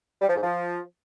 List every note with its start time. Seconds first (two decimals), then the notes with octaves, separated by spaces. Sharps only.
0.22 G3
0.29 F3
0.36 G#2
0.43 F3